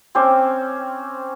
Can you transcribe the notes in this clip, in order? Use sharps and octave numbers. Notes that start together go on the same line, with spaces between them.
C4 C#4 C5 D6